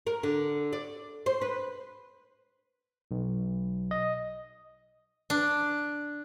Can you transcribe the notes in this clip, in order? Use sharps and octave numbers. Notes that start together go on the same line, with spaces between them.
A#4
D3
D5
C5
B4
B1
D#5
D4